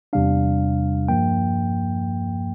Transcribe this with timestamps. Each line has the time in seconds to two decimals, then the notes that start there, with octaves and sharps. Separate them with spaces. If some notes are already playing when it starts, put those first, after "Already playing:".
0.13 E2 C3 G3 D4 F5
1.08 G2 F3 A#3 G5